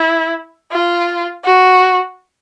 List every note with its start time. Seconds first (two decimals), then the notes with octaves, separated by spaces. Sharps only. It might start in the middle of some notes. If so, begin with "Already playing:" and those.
Already playing: E4
0.73 F4
1.45 F#4